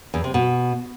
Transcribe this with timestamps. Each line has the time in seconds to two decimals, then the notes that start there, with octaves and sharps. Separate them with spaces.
0.14 E2
0.24 C3
0.34 B2